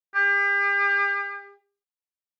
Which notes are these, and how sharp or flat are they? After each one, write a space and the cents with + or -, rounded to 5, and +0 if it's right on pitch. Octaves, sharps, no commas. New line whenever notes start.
G4 +40